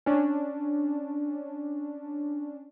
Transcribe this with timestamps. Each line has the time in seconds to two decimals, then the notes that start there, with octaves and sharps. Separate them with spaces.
0.06 C#4 D4